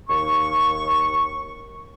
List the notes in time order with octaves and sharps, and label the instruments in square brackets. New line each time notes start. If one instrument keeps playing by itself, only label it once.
[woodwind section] D#2 C#6